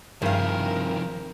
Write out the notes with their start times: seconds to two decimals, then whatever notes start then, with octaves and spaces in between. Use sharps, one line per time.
0.22 G2 C3 D#3 F3 G#4 A#4 F5